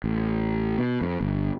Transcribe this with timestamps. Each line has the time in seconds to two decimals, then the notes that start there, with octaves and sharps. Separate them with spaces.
0.04 A1
0.78 B2
1.01 F2
1.21 G1